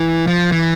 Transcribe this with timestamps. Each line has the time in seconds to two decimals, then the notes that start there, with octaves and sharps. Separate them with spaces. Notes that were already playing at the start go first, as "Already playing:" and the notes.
Already playing: E3
0.27 F3
0.52 E3